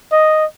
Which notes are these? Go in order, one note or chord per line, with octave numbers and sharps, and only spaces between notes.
D#5